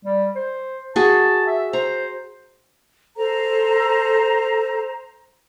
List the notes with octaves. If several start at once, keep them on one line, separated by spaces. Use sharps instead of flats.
G3
C5
F#4 G#4 A5
E5
C5 A#5
A4 C5 A#5